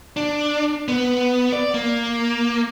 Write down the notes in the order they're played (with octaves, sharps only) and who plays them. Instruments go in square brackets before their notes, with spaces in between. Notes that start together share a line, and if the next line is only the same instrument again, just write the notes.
[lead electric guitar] D4
B3
D5
A#3